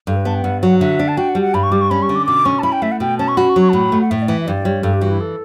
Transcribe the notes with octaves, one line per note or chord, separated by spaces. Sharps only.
G2 A4
B4
B3 A5
G5
G2 F#5
F#3 F#5
D3 E5
D4
A5
F#4 G5
F#5
G3
F#5
G2 B5
C#6
G3 D6
C#6
C#4 B5
C#6
D3
D6
B2 D6
C#4 C#6
A5
E4 B5
G5
A3 E5
F#5
B2 G5
C#4 A5
C#6
F#4 B5
C#6
F#3
C#6
A5
A2 B5
A3
F#5
A2 E5
D5
E3 E5
E5
G2 D5
G3 C#5
G2 A4
G4
E3 F#4
E4
A4